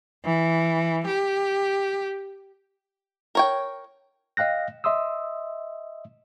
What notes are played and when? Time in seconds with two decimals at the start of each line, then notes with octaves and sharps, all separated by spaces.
0.25 E3
1.07 G4
3.35 A#4 C#5 G5
4.37 D#5 F5 G5 F#6 A#6
4.84 D#5 E5 C6 D#6 E6